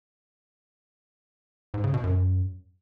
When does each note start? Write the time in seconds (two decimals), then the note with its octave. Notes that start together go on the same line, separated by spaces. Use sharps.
1.74 G#2
1.84 C#3
1.94 B2
2.04 F#2